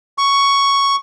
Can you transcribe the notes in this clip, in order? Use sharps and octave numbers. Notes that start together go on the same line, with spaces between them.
C#6